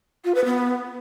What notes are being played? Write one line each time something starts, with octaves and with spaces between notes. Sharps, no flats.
F4
B4
B3